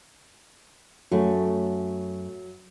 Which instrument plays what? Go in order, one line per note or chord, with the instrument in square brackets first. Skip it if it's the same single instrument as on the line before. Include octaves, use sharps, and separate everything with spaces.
[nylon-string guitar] F#2 A3 [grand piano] F#3